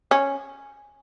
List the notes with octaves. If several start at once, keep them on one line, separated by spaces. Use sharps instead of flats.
C#4